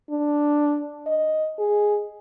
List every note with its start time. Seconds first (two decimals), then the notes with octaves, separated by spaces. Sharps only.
0.10 D4
1.06 D#5
1.59 G#4